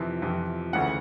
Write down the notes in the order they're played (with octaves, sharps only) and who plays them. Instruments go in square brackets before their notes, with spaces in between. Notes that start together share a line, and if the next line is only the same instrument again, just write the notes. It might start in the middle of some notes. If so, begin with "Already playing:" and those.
Already playing: [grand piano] F2 C3 E3
F2 C3 E3
D2 C#3 E3 F#5